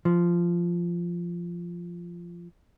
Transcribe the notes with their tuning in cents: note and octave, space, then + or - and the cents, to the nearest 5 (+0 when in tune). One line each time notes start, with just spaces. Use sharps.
F3 -10